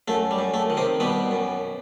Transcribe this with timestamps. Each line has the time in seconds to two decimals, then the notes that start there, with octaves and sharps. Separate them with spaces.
0.08 F#2 A3
0.31 G3
0.39 F#2
0.54 A3
0.70 D#3
0.77 C3 C4
1.00 B2 G3 B3
1.31 F#2